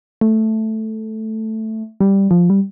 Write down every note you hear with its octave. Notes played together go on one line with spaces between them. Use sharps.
A3
G3
F3
G3